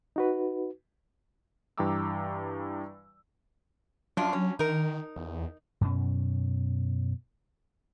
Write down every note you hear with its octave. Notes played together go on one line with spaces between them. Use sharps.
D#4 F#4 B4
G2 E3 G5 A#5 D6 E6
F#2 F#3 D4 F4
C#4
D#3 D#4 A#4
E2
F#2 B2 C#4